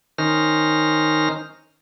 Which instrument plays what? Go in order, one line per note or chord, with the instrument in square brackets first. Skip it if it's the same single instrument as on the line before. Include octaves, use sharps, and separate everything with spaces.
[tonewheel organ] D#3 C#4 D#4 C5 F6 A#6